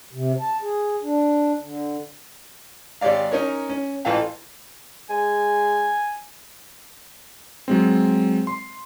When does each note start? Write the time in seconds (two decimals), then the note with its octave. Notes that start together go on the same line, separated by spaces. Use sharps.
0.13 C3
0.40 A5
0.62 G#4
1.03 D4
1.62 D3
3.01 G#1 G4 C#5 D5 F5
3.32 C#4 D#4 A#4 C#5
3.69 C#4
4.05 A1 E3 F4 A4 F5 G5
5.10 G#3 G#5
7.68 F#3 G#3 C4
8.47 C6